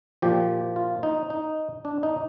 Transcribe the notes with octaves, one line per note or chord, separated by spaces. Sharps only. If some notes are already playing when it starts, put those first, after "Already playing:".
A#2 F3 G4
F4
D#4
D#4
D4
D#4